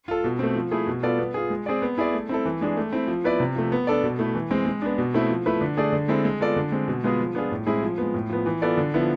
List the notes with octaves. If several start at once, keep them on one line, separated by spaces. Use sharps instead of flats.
F4 A4
B2
A3 C4
F3
A3 E4 G#4
B2
B3 F4 A4 D5
B3
F4 G#4
G#3
C4 G#4 D5
B3
E4 G#4 D5
A3
C4 E4 A4
E3
G#3 D4 G#4
A3
C4 E4
F3
B3 E4 B4 D5
C3
F3 A3
B3
D4 A4 D5
B2
A3 E4
E3
G#3 C4
G#3
B3 D4
B2
A3 C4 E4
F3
A3 E4 B4
D3
A3 D4 G#4 D5
D3
G#3 C4 E4 A4
G#3
B3 F4 A4 D5
D3
G#3 C4
B2
G#3 B3 F4 G#4
F3
B3 D4 F4 G#4
A2
G#3 C4 E4 G#4
F3
G#3 B3
A2
F3 B3
E3
B3 F4 A4 D5
D3
F3 B3 E4